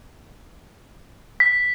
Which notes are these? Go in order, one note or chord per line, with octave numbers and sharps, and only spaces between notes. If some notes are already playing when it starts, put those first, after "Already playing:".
B6